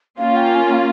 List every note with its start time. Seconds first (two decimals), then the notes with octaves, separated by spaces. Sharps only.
0.18 A#3 C#4 F4 F5
0.37 G5
0.55 G#5
0.73 F5